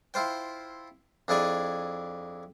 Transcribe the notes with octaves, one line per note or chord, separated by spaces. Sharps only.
E4 F4 C5 G5
F2 D4 E4 G#4 D5 G#5